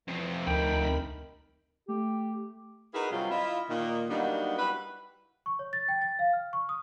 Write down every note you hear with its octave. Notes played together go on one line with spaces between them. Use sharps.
F2 C3 E3
D2 D#4 A#4 G5 B5
A3 G4
D#4 E4 F#4 G#4 A#4 B4
G2 C3 D#3 F#3 G3 F4
E4 F4 D#5
A#2 D#3
F#3 G3 A#3 B3 D4 D#4
G3 E4 F#4 B4
C#6
C#5
A6
G5
A6
F5
F6
C#6
D#6